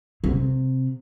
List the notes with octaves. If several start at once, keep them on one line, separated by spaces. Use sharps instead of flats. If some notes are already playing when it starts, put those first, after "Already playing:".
C3